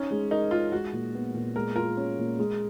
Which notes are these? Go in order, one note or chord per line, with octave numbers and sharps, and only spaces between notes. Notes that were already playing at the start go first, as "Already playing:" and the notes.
Already playing: C#4 D#4
G#3
D#4 A#4
G#3 F4
G#3 F#4
A#2
B3
A#2
G#3 A#4
F4 A#4
C#4
A#2
G#3